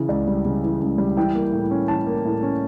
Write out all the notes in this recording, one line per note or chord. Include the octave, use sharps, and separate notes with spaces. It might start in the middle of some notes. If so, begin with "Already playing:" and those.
Already playing: C#3 E3
C#2 D5
G3
C#3
E3
C#2
G3
E3 G5
A#3
A2
C#4
E3 A5
A#3
A2
C#4